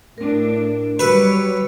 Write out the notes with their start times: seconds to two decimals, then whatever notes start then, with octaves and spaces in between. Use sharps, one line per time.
0.18 A2 D4 A#4
0.99 F#3 G3 F#4 B4 C#5 E6